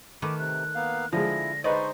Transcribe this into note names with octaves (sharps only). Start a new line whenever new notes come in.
D#3 A3 B4 D6
C3 F#6
A#3 B3 F5
D3 F3 G#3 E4 A#6
G#3 D#4 B4 C5 D5 D#5 C#6